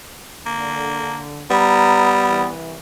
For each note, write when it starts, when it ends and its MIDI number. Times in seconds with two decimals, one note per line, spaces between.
0.46 1.44 50
0.46 1.21 58
1.50 2.49 55
1.50 2.47 59
1.50 2.13 82
2.28 2.77 36
2.28 2.77 52